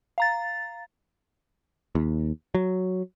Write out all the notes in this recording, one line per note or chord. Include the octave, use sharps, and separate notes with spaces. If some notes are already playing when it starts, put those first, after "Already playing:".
F5 A#5 A6
D#2
F#3